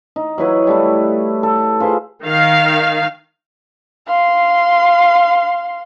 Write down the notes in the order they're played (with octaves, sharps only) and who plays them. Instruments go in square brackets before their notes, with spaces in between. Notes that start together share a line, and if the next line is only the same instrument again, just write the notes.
[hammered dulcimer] D#4
F#3 E4 B4 C#5
G3 A3 E4
A4
F4 G#4 B4 C5
[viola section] D#3 F5
[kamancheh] F5 C6